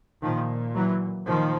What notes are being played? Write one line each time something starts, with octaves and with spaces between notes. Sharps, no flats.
A#2 D#3 F3
E3 F#3
A#2 D#3 F3